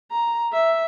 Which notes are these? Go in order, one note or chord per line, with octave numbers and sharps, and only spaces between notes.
A#5
E5